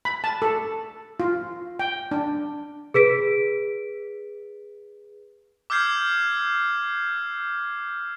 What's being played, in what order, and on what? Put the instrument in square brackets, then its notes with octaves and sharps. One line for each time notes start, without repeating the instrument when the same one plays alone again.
[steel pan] B5
A5
A4
F4
G5
D4
[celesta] G#4 B4 B6 D7
[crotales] D6 E6 F6 G6 G#6 C7